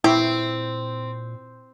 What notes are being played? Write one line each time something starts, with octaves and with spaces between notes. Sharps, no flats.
A#2 C4 E4 G4 C#6